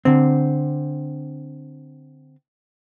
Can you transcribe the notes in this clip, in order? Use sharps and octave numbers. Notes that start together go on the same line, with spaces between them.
D3 C4